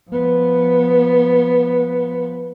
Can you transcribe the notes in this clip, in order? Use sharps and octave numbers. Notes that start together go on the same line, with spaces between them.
F3 B3